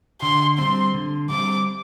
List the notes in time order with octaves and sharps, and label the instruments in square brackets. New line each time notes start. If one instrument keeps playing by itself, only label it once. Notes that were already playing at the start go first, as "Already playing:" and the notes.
[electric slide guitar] D3 [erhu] C6
[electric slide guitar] G3 C4 [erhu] C6
[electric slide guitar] D3
[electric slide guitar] G3 C4 [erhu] D6